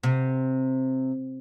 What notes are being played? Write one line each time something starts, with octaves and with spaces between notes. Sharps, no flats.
C3